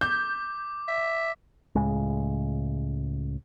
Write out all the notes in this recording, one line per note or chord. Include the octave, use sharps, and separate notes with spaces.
D6 G6
E5
C#2 A2 C#3 G#3